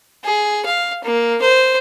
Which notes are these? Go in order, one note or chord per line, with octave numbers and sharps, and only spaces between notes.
G#4
F5
A#3
C5